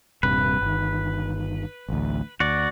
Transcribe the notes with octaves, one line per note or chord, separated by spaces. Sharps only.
D#1 G2 C3 B4
G1 D#3
A1 D2
D2 F#4 D5